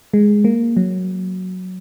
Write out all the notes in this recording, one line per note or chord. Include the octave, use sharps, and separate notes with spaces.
G#3
A#3
F#3